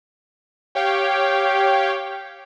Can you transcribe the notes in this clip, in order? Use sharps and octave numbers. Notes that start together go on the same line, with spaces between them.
G4 C#5 F5 G5